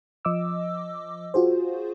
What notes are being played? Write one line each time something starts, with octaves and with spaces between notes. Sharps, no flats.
F3 D#5 D6 E6
F4 F#4 G#4 C5